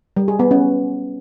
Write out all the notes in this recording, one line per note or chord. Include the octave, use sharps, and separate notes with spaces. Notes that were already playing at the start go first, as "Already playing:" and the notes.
G3
G#4
B3
C#4